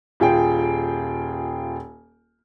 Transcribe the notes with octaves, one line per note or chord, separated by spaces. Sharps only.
D#1 F4 G#4 G5